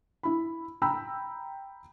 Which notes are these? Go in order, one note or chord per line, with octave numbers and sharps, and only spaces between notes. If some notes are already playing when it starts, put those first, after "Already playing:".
E4 B5
G5 A#5 B5 E6